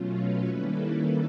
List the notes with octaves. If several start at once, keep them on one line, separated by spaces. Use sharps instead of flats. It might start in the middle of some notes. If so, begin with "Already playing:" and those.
Already playing: B2 F#3 A3 C#4 F4
B4 C#5
D#3 G3 A#3 C#4 E4 A4 B4